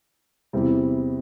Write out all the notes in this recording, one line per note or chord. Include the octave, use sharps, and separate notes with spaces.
E2 C3 G3 C4 E4